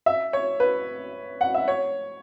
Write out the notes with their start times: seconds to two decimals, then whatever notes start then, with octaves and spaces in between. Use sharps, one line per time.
0.06 E5
0.33 C#5
0.60 B4
1.41 F#5
1.54 E5
1.68 C#5